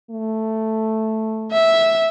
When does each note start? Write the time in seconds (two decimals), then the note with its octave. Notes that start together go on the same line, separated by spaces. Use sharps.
0.11 A3
1.52 E5